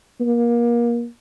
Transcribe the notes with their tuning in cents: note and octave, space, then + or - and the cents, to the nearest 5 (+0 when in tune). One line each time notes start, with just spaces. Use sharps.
A#3 +30